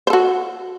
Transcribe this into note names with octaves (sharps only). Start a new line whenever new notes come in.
F#4 A4 C5